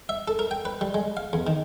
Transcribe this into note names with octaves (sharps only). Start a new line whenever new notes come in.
E5
A4
A#4
G5
B4
G3
G#3
F5
E2
D#3